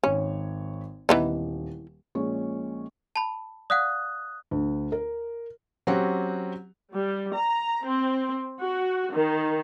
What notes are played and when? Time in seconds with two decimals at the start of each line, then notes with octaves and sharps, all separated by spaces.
0.03 G#1 C#4 C#5
1.09 D#1 E3 B3 D#4
2.15 A#1 A#2 G#3 C#4 C#5 C#6
3.16 A5 B5
3.70 D5 F5 F#5 D#6 F#6
4.51 D2
4.92 A#4
5.87 F#3 C4 C#4 F#4 G4 F#5
6.94 G3
7.34 A#5
7.83 C4
8.61 F#4
9.12 D#3